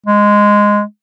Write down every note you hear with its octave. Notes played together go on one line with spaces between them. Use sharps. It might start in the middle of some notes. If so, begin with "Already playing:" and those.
G#3